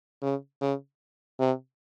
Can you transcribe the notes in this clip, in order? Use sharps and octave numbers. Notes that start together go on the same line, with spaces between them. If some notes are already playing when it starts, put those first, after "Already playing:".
C#3
C#3
C3